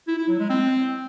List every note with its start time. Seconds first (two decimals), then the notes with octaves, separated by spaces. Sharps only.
0.08 E4
0.18 E4
0.29 F#3
0.39 G#3
0.50 C4